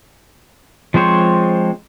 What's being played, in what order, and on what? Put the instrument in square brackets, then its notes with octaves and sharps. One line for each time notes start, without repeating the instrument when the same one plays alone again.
[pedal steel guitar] F3 G#3 C4 C5 C#5